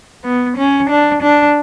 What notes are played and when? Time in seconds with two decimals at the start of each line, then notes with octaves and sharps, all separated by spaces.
0.24 B3
0.57 C#4
0.89 D4
1.22 D4